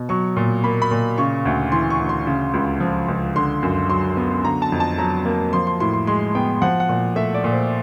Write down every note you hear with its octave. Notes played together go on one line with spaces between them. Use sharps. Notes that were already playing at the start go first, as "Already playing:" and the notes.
Already playing: B2
F#3 C#6
A#2
A#3 B5
B5
A#2
C#3 C#6
D2
E3 C6
C#6
D2
C6
C#3
C#2
F3
C#2
D3 C6
F#2
F#3 C6
B3
D3 A#5
A5
F2
A5
F#3 A#5
A#3
F3 C6
C6
A2 C6
C6
G#3 C6
B3 G5
F3 F#5
F#5
A#2
A3 E5
D5
A#2
C5